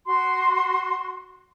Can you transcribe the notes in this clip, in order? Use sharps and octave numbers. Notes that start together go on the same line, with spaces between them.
F#4 C6